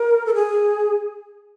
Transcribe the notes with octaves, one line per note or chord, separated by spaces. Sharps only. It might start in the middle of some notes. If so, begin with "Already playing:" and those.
Already playing: A#4
A4
G#4